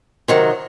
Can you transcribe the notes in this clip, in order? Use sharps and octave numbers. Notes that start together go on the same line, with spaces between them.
C3 D#3 F#3